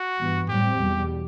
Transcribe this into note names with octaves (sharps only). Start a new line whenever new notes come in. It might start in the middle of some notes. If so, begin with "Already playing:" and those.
Already playing: F#4
G2 E3 B3
A2 G3 C4 G4
E2 B2 G3